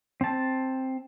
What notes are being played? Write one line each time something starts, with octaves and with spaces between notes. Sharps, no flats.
C4 A5